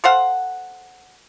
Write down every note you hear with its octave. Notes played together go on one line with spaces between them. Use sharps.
A4 C5 F5 F#5